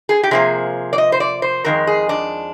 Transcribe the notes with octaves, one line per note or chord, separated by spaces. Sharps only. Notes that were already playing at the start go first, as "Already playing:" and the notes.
G#4
G4
C3 F3 A#3 G#4
D5
D#5
C5
D5
C5
F2 D#3 G#3 A#4
G#4
D4